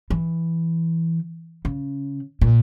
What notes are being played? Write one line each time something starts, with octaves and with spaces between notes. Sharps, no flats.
E3
C#3
A#2